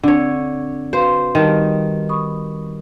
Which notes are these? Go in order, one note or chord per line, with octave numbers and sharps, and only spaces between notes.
D3 C4 C#5
F#4 B4 C5 F5
D#3 G3 G4 A5
B5 C#6 D#6